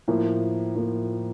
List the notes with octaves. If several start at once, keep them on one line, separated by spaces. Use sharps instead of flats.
A2 F3 A#3
A2 F3 A#3